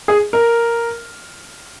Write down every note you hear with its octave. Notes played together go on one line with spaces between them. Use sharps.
G#4
A#4